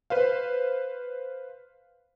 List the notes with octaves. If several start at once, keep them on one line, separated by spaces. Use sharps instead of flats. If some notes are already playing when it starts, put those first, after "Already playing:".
B4 C5 F5